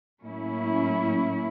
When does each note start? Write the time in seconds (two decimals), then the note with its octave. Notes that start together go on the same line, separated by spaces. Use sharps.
0.22 A2 F#3 A#3 C#4 E4